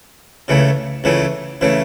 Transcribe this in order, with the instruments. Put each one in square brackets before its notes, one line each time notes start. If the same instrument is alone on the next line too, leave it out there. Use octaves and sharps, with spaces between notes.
[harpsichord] C#2 C#3 E3 A3
C#2 C#3 E3 A3
C#3 E3 A3